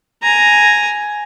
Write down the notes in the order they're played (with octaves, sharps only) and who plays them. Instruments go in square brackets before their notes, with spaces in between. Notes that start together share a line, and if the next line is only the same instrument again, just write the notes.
[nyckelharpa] G#5 A#5